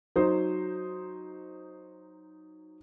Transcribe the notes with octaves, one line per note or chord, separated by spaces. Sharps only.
F#3 D#4 C5